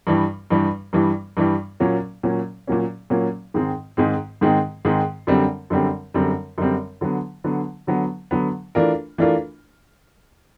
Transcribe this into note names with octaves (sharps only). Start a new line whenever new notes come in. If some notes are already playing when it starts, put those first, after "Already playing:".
G2 E3 G3
G2 E3 G3
G2 E3 G3
G2 E3 G3
A#2 F#3 A#3 C#4
A#2 F#3 A#3 C#4
A#2 F#3 A#3 C#4
A#2 F#3 A#3 C#4
G#2 D#3 G#3 C4
G#2 D#3 G#3 C4
G#2 D#3 G#3 C4
G#2 D#3 G#3 C4
F#2 D3 G3 C4
F#2 D3 G3 C4
F#2 D3 G3 C4
F#2 D3 G3 C4
D3 F#3 B3
D3 F#3 B3
D3 F#3 B3
D3 F#3 B3
E3 A3 D4 F4 A#4
E3 A3 D4 F4 A#4